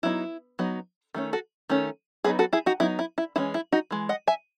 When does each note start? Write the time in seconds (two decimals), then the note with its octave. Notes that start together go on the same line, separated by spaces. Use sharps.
0.03 F#3 B3 D#4 E4
0.59 F#3 B3 D#4
1.14 D#3 A3 C#4
1.33 F#4 A4
1.69 D#3 A3 C#4
2.24 F#3 B3 D#4 G#4 B4
2.39 F#4 A4
2.53 E4 G#4
2.66 D#4 F#4
2.80 F#3 B3 D#4 E4
2.99 E4
3.18 E4
3.36 E3 G#3 C#4 E4
3.54 E4
3.72 D#4 F#4
3.91 E3 G#3
4.09 D#5 F#5
4.27 E5 G#5